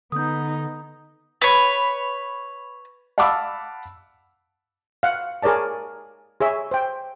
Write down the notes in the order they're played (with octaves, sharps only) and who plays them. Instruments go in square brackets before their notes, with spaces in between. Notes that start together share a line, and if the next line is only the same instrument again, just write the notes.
[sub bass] D3 [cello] B3 D#4 [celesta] D#6 G6
[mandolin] B4 C#5
[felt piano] F5 F#5 A5 B5 D6 E6
[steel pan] F5 F#5
G#4 A#4 C#5 D5 A5
G#4 C#5 E5
C5 G5